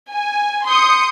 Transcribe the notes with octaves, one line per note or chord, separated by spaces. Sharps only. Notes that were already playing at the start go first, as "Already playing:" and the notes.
G#5
C6 D#6 G6 C#7